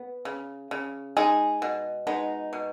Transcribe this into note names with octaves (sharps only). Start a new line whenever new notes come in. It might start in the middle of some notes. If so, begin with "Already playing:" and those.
Already playing: B3
C#3
C#3
G#3 D#4 G#4
B2
G#3 B3 D#4
B2